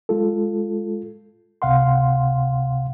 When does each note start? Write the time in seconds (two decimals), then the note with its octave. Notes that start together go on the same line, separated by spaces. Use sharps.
0.09 G#3 F4 A4
1.62 C#2 C3 F5 F#5 C6